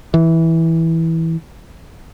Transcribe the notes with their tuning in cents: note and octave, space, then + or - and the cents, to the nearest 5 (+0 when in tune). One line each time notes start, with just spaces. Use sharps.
E3 -10